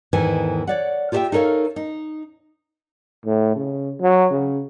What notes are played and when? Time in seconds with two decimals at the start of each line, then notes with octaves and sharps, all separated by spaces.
0.13 E2 G#2 D#3 E3 A4 G#5
0.67 C#5 D5 F#5
1.12 F4 G4 A4 D5 E5 G5
1.32 D#4 A4 A#4 C#5 F5
1.76 D#4
3.26 A2
3.56 C#3
4.01 F#3
4.31 C#3